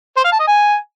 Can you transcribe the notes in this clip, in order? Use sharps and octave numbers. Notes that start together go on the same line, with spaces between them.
C5
F5
A5
D#5
G#5